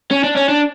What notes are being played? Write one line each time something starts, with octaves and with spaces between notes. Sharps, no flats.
C#4
D4
C#4
D4